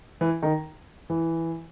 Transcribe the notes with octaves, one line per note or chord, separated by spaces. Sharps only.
E3
D#3
E3